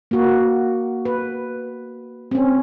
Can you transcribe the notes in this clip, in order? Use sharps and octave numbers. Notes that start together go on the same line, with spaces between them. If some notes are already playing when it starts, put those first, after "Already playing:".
A#3 F#4
B4
C4 C#4